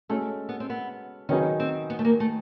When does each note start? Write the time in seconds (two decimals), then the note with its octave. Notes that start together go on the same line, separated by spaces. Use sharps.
0.09 G#3 A3 C#4 F#4 A4
0.49 B3
0.60 C4
0.70 B3
1.29 D#3 F#3 B3 C#4 D#4 G#4
1.60 C4
1.90 B3
1.99 A3
2.05 A#3
2.20 A3